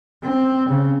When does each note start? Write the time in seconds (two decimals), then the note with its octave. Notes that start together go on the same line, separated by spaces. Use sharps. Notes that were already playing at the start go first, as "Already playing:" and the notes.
0.23 C4
0.69 C#3